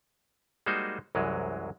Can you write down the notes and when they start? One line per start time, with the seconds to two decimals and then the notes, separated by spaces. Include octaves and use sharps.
0.66 G3 G#3 A#3 D#4 F#4 C5
1.15 C2 F#2 E3 F#3 G#3